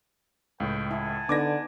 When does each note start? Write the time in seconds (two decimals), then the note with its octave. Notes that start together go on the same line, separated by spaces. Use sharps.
0.60 C#2 A2 B4 G5
0.91 E4 F#5 G#5 A5
1.29 D3 B3 D4 D#4 D6 G#6 A#6